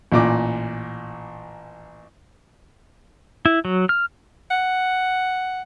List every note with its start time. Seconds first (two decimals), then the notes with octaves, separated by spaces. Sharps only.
0.12 A1 A#2 D6
3.46 E4
3.65 F#3
3.89 F6
4.50 F#5